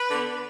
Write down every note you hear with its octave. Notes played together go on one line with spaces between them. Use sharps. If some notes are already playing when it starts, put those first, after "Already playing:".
Already playing: B4
D3 B3